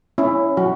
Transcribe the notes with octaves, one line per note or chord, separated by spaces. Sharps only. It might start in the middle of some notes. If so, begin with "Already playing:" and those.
C#4 E4
F#3 F#4